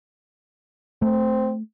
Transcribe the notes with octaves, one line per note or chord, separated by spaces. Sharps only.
A3 C4